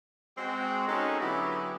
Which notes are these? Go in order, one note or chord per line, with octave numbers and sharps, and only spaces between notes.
G#3 C4 F#4
G#3 C#4 D#4 F#4 A4 A#4
D3 F#3 B3 E4 G4 G#4